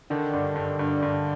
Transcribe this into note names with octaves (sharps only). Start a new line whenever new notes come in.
D3 D#3
G2
G2
G2
G2